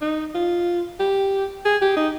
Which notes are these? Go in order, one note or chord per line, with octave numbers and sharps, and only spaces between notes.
D#4
F4
G4
G#4
G4
D#4